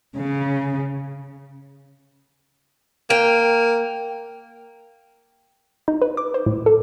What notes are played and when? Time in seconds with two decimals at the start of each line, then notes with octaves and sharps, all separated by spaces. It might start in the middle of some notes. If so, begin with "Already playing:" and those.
0.15 C#3
3.10 A#3 G5
5.88 D#4
6.02 B4
6.17 D6
6.34 C5
6.46 A2
6.66 A4